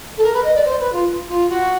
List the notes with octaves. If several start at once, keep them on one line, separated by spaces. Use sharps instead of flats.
A4
A#4
B4
D#5
D5
C5
B4
F4
F4
F#4